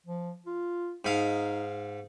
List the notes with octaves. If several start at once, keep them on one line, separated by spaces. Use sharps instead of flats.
F3
F4
G#2 D#4 F5